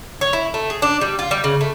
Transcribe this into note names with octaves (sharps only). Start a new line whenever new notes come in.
C#5
E4
A3
G#4
D4
G3
F4
G3
C#3
A3